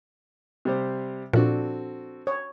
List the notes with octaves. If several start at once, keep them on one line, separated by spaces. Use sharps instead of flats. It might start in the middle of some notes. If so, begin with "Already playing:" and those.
C3 G3 C5
A#2 F3 C4 D4 F#4 A4
C#5